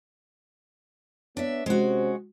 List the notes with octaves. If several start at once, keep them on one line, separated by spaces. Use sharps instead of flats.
B3 D4 C#5 E5
C3 G#3 C#4 F#4 C5